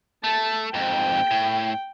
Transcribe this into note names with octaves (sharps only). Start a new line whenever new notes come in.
A3 A5
F2 G#2 G5
A2